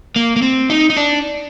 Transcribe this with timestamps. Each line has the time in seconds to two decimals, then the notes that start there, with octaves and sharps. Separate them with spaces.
0.16 A#3
0.36 A#3
0.42 C4
0.70 D#4
0.90 D#4
0.97 D4